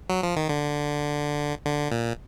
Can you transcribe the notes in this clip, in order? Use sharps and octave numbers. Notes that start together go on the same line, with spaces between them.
F#3
F3
D#3
D3
D3
A#2